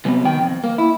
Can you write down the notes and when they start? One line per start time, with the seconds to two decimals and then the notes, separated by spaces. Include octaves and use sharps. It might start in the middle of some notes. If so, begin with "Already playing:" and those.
0.05 C3 F#3 B3
0.25 D#3 G5
0.41 F2
0.64 A#3
0.78 E4